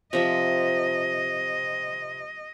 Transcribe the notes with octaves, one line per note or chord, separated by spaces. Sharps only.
C3 F3 D#5 E5